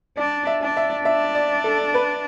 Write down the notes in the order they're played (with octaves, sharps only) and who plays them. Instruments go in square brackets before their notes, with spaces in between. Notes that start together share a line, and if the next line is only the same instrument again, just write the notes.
[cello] D4 [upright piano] D5
[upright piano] E5
[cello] D4
[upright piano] E5
[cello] D4 [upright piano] E5
[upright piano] D5
A4
B4